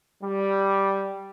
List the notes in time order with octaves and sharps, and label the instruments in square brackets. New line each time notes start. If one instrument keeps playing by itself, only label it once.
[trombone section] G3